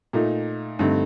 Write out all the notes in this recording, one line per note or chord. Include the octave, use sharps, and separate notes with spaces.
A#2 A3 D#4
G2 D3 A3 C4 D#4